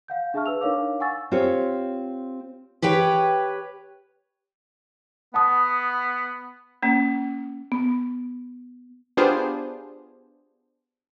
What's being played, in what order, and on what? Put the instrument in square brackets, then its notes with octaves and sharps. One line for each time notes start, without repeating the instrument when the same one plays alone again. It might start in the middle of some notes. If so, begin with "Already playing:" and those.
[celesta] F5 F#5 G6
D4 G#4 E5 A5 C#6 F6
B4 E6 F7
D4 D#4 A#4 C#5 F5 D6
F#5 G#5 C#6 E6 A6
[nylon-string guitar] C4 F4 G4 C#5
[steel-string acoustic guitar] G4 B4 C#5 G5
[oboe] B3 [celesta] F#5 A5 D#6
[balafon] A#3 C#4
[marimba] B3
[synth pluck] B3 D4 F4 G4 G#4 C5